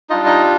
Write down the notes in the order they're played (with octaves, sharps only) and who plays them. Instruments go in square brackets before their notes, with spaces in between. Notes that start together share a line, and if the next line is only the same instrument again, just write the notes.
[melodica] G3 D4 D#4 F4 D#5
D#4 D#5